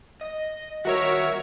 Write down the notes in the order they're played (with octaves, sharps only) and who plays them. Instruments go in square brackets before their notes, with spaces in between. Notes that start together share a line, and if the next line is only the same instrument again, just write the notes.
[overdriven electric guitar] D#5
[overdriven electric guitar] D#3 G3 [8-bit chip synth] F#4 A#4 C#5 [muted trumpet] E5